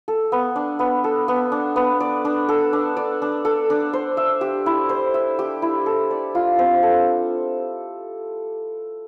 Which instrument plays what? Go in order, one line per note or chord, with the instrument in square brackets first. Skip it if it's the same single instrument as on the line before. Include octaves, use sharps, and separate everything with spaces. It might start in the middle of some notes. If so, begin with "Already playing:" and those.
[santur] A4
B3
D4
B3
A4
B3
D4
B3
D5
D4
A4
D4
D5
D4
A4
D4
C5
E5
G4
E4
C5
E5
G4
E4
A4
D5
F4
C4
A4